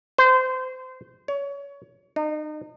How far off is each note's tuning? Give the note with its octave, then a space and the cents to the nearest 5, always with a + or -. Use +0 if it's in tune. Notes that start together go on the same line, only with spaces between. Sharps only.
C5 -25
C#5 +25
D#4 -35